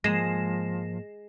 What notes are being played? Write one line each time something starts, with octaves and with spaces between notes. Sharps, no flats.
G#2 F3 G#3 A#3 A#6 C7 E7